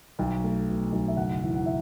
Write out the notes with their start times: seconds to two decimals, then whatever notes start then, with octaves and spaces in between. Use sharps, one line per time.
0.19 B1 G5
0.43 A3
0.68 B2
0.92 B1
1.08 E5
1.16 F#1 F#5
1.41 E2
1.55 F#5
1.66 E5